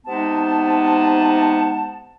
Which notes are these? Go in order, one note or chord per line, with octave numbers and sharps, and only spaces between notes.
C3 G#3 B3 D#4 A5